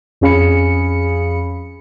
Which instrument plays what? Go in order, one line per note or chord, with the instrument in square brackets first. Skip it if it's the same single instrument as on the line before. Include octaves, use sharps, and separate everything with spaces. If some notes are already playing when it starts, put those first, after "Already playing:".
[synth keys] F2 C#4 G#4 F5 B5 C#7